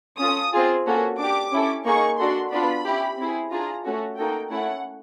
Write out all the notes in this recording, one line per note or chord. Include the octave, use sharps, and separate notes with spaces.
C#4 F4 A4 D#6
C4 F4 G#4
A#3 C#4 F#4 A4
D4 G4 D6
C#4 E4 A4
A#3 D#4 G#4 C#6
D4 F#4 A4 C6
B3 D4 F4 B5
C#4 E4 G4
C4 E4 G#4
D4 F4 G#4 A#5
A3 C#4 F#4 A4
A#3 D#4 F#4 A4 G5
A3 C#4 E4 F#5